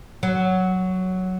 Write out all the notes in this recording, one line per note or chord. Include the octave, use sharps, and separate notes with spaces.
F#3